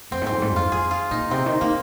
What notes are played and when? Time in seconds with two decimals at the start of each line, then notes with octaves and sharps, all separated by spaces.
0.11 F2 C4
0.22 G#2
0.27 F2 C4
0.42 G#2
0.52 F2 F4
0.72 F2 G#4
0.91 F4
1.11 A#2 D#4
1.31 C3 C4
1.46 D#3
1.61 D#3 A#3